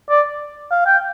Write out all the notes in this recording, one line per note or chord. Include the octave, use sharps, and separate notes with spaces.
D5
F5
G5